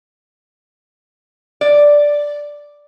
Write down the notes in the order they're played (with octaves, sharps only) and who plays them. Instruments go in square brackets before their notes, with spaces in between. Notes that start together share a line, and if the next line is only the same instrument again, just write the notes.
[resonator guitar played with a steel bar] D5